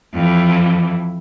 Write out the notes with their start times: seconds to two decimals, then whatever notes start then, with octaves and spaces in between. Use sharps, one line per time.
0.13 F2 E3